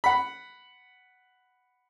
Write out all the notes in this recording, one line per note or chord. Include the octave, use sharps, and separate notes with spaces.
F#5 B5